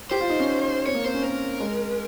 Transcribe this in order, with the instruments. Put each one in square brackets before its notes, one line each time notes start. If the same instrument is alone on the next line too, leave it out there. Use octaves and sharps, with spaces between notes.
[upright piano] G4 [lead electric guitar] C5
[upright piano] F4
D#4
C#4
[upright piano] C4 [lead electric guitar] C#5
[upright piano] A#3
[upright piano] C4 [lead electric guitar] C5
[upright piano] C#4
[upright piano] C4 [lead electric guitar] A#4
[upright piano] G#3